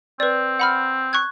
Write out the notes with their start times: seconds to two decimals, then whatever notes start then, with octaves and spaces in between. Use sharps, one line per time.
0.20 C4 B4 D5
0.60 F#5 B5 F6
1.13 C#6 F#6 G#6